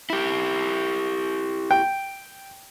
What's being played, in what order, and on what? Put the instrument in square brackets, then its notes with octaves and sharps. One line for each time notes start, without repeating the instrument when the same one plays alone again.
[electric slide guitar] E4 G4
[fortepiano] G5